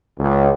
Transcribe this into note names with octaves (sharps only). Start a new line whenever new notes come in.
C#2